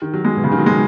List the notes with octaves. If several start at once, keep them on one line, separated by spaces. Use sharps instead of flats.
D#3
F#3
G#3
B2
C#3
D#3
F#3
G#3